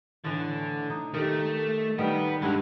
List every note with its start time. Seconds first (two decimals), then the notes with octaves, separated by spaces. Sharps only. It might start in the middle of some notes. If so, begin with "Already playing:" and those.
0.24 A2 D3 E3
0.90 D#4
1.14 D#3 A3 G4
1.98 D#3 G3 B3 G4
2.42 G2 G#3 E4 A#4 F#5